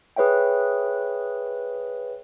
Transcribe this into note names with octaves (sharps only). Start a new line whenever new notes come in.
G#4 B4 C#5 E5 G5